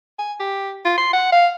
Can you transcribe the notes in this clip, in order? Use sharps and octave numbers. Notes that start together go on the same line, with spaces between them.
G#5
G4
F4
C6
F#5
F5